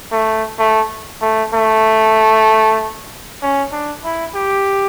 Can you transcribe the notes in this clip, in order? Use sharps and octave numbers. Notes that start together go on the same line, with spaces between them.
A3
A3
A3
A3
C#4
D4
E4
G4